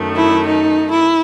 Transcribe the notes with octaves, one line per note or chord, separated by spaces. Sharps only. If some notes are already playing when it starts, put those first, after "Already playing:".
Already playing: F#2 D#3 A3
E4
D#4
E4